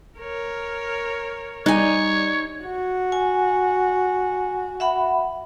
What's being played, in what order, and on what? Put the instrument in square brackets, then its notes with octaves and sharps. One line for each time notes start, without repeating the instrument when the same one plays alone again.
[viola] A#4 C#5
[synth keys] G3 D5 [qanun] D#4 G#5 [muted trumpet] C#5
[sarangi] F#4
[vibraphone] G#5
E5 F#5 B5